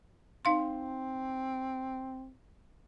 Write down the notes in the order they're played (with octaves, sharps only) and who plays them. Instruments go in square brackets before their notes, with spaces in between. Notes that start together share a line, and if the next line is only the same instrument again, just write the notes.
[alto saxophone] C4 [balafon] D#4 F5 C6